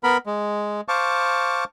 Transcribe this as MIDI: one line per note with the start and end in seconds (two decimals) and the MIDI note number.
0.04 0.17 59
0.04 0.17 70
0.04 0.17 83
0.26 0.81 56
0.88 1.64 72
0.88 1.64 77
0.88 1.64 81
0.88 1.64 85
0.88 1.64 86